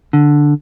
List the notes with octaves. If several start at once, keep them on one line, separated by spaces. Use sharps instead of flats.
D3